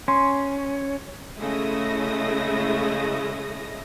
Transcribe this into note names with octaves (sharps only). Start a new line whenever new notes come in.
C#4 C6
C#3 G#3 A3 E4 D#6 A#6